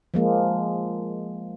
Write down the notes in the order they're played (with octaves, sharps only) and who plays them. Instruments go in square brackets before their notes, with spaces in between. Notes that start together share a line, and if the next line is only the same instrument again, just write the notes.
[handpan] F3 G#3 A#3